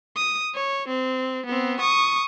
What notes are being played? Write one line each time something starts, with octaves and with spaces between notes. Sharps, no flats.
D#6
C#5
C4
B3 C4
C#6 D#6